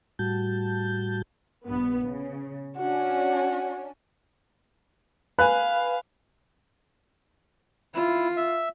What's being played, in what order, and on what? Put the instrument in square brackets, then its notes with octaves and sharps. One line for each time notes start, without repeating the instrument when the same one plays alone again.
[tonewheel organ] A2 G3 F#4 A5 G6
[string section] A#1 G2 B3
C#3
[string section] C#4 D4 [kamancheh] F#4
[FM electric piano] B4 [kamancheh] F5 [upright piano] G#5 B5 [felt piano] F#6
[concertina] E4 [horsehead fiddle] F4
[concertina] E5